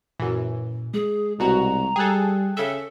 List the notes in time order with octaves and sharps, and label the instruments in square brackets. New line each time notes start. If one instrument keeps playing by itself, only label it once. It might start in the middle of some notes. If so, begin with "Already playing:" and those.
[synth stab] F#2 E3 [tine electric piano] A#2
[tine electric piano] G#3 [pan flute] G#4
[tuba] C2 [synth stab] B2 F#4 [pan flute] A#5
[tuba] G3 [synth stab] G#4 A4 [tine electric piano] G5 F#6
[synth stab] C#3 E5 [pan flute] A4